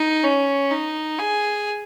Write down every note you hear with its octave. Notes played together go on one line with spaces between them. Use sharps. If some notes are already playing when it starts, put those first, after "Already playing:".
Already playing: D#4
C#4
D#4
G#4